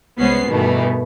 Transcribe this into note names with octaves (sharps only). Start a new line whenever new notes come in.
C2 G#3 B3 C#4 C5 C7
G2 B2 D#3 E3 A3